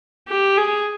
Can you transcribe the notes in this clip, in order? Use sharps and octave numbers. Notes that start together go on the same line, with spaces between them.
G4
G#4